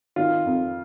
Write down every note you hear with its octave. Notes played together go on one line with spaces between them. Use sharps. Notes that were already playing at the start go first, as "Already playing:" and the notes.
D#3 F4
F2